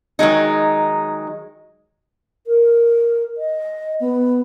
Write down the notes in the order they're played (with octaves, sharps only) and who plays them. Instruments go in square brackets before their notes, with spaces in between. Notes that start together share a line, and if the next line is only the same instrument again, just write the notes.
[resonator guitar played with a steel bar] D#3 F#3 G#3 D#4
[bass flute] A#4
D#5
B3